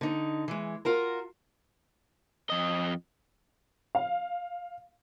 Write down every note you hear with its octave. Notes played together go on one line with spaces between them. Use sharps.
D3 D#4
E3 G#3
F4 F#4 A#4
F2 D#5
F5